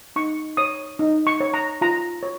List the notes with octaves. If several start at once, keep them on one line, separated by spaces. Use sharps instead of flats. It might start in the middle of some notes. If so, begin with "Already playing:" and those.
D#4 C#6
C#5 D#6
D#4
C#6
C#5
A#5
F4 A#5
C#5